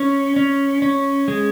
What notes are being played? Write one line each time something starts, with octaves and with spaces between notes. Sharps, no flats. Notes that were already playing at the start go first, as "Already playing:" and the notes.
Already playing: C#4
C#4
C#4
G#3